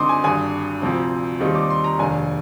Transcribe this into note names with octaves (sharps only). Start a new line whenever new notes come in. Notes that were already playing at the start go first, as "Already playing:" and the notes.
Already playing: D2 D3 G#3 C4 D#4 C6 D6 D#6
G#5
G#1 G2 D3 G#5
D2 C3 F3 C4
D#2 D#3 G3 C4 D#4
D6
C6
A#5
F1 D#2 D#3 G#3 D4 G#5